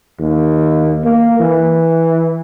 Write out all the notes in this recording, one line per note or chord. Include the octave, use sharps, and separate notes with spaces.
D#2
A#3
E3